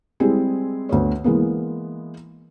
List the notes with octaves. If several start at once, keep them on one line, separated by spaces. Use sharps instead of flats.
G3 G#3 C4 E4 G#4
D2 B3 C#5
E3 G#3 A#3 B3